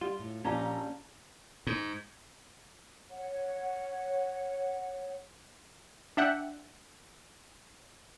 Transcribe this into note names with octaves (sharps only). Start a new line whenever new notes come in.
G3 F4
A2
A#1 A#2 F3 C#4 F4 G4 A5 A#5
G#2
C#5 F#5
D4 E5 F#5 G5